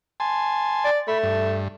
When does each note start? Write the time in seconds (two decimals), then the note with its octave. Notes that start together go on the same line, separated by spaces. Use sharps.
0.20 G#5 A5 C6
0.84 D5
1.08 A3 B5
1.23 G2